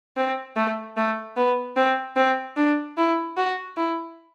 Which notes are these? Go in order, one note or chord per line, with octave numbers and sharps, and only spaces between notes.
C4
A3
A3
B3
C4
C4
D4
E4
F#4
E4